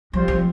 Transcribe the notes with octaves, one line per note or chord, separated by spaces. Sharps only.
F3 G3 C4 F4 C5
F3